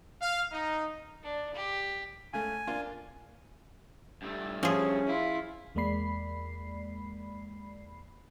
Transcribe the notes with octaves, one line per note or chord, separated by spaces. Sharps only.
F5
D#4
D4
G4
C#3 A3 G#5
A#3 D4 F4
G2 A3
F3 C#4 G#4
E4 F4
E2 G#3 A#3 D5 B5 C7